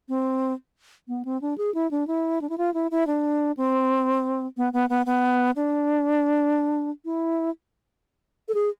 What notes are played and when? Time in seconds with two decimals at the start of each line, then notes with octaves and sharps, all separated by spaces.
0.09 C4
1.08 B3
1.25 C4
1.41 D4
1.58 G#4
1.74 E4
1.91 D4
2.07 E4
2.41 D4
2.49 E4
2.58 F4
2.74 E4
2.91 E4
3.07 D4
3.57 C4
4.57 B3
4.73 B3
4.89 B3
5.06 B3
5.56 D4
7.05 E4
8.48 A4
8.54 G#4